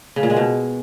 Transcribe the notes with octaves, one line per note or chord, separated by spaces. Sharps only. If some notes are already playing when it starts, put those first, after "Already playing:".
C#3
A#2
G#3
B2